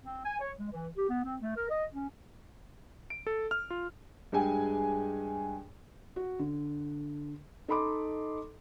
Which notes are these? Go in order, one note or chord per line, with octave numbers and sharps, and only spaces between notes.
C4
G#5
C#5
G#3
E3
G4
B3
C4
A3
A#4
D#5
C#4
D7
A4
F6
F4
G2 G#3 G4 G#4 G5 G#5
F#4
D3
D#4 A4 D#5 B5 C6 D6